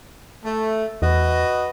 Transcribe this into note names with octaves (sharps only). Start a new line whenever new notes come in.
A3
E2 F#4 B4 D#5